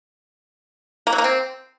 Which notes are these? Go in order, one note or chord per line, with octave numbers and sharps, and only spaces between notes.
A#3
F#3
A#3
C4